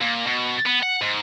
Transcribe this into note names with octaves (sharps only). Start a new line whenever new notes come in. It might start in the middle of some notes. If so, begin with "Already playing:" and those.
A#2
B2
B3
F#5
G#2